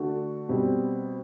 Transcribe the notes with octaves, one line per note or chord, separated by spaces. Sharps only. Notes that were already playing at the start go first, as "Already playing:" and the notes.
Already playing: D3 A3 D4 F#4
B2 G3 C4